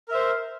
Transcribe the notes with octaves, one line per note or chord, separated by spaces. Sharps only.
A#4 C5 E5